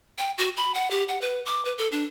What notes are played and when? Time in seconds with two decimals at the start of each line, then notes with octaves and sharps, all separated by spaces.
0.18 G5
0.38 F#4
0.57 B5
0.74 F#5
0.91 G4
1.08 F#5
1.21 B4
1.46 D6
1.65 B4
1.78 A4
1.92 D4